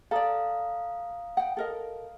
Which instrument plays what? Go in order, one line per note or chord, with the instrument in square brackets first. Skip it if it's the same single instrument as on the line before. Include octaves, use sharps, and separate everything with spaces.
[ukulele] A4 D5 [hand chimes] F5 A#5 D#6
[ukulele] F#5 G5
A4 A#4 D#5